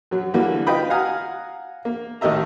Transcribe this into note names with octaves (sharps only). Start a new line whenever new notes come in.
F#2 F#3
D3 E3 F#3 G3 A#3
D#4 F4 B4 G5 B5 D#6
F5 F#5 G#5 A#5 D#6 F6
A#3
A1 D#3 G4 D#5 E5 A#5